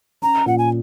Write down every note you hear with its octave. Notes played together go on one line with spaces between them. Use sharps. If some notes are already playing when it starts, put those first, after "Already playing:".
C#4 A#5
A#2 F#5
G#5